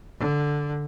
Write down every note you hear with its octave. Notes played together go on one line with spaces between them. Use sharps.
D3